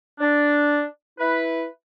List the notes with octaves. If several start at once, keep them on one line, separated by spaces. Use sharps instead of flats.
D4
E4 B4